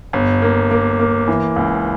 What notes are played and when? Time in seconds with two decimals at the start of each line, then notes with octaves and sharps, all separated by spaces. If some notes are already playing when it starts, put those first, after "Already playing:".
0.13 G1
0.42 A#3
0.71 A#3
0.99 A#3
1.28 E3
1.56 C#2